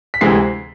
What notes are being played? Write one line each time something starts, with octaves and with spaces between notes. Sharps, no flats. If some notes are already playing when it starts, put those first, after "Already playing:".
B6
D2 C3 E3 G#3 C4 C7